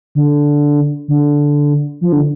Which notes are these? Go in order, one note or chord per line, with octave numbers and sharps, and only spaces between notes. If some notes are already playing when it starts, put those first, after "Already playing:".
D3
D3
F3
D3